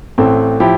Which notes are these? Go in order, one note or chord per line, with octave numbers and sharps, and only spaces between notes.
A1 A3 C4
F3 E4 G4